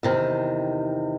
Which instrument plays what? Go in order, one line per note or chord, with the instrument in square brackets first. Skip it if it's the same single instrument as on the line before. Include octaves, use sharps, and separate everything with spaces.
[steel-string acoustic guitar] E2 C3 D#3